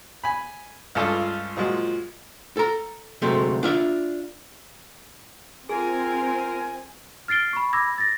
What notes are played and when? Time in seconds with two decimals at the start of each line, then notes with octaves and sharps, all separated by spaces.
0.24 G#5 B5
0.95 C#2 G2 C#3 F4 A4 A5
1.57 A#2 F3 F#3 G#3
2.57 A4 A#5
3.22 D2 C3 F#3 G#3 A3
3.63 D4 F4 E5
5.69 C4 F4 G#4 A#4 G#5
7.28 F6 A6 C7 D7 G7
7.53 B5 C#6
7.73 B5 D6 E6 G#6 A#6
7.98 A6 A#6